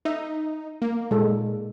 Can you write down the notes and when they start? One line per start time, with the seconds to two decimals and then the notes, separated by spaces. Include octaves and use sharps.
0.05 D#4 E5
0.82 A#3
1.11 A#2 G#3 A4